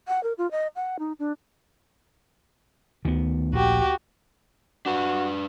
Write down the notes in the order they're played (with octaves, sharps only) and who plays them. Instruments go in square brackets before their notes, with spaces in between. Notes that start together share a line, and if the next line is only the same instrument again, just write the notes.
[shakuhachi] F#5
A#4
F4
D#5
F#5
D#4
D4
[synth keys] D2 [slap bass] D#3 B3
[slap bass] A#1 [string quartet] F#4 G4
[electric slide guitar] D4 B4 [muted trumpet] F#4